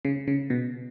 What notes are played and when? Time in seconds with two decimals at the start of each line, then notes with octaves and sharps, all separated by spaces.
0.05 C#3
0.28 C#3
0.50 B2